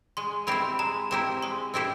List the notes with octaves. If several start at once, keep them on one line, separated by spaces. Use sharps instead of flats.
G#3 C6
C4 E4 G4 C5 B5
G#3 A#5
C4 E4 G4 C5 A#5
G#3 C6
C4 E4 G4 C5